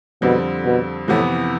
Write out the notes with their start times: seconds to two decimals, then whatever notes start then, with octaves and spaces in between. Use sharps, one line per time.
0.22 F2 B2 D3 G3 C4
0.64 B2
1.07 F2 A2 C3 E3 B3